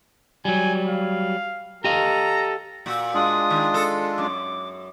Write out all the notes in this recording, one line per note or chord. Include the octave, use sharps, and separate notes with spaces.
F#3 G3 G#5
F5
G4 A4 D#5 F5 A#5
A#2 F#4
G#3 D4 F4 D#6
D#3
A4
F#2 D6